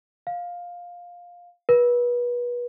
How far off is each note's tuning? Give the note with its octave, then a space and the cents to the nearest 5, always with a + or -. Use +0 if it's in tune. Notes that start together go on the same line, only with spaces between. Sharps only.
F5 +10
B4 -30